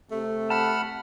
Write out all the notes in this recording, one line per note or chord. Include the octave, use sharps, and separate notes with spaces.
C3 A3
F#5 A5 B5 F6